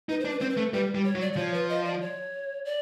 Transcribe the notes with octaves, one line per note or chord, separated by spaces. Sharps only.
D#4 B4
C5
D4
B4
C4 C5
B4
A3
G3 B4
G3
C#5
F#3
D5
D5
F3 C#5
B4
D#5
D5
C#5
D5